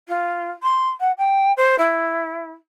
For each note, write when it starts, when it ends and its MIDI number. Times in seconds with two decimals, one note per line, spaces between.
0.08 0.48 65
0.62 0.88 84
1.00 1.11 78
1.18 1.52 79
1.57 1.75 72
1.78 2.51 64